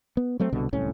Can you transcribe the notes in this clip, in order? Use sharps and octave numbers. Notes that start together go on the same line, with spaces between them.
B3
F#3 A3 C4
C2 B2 D3
D1 C2 A2 C#4